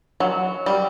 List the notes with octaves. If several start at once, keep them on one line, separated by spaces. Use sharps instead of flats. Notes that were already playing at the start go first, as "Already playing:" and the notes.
F#3
G3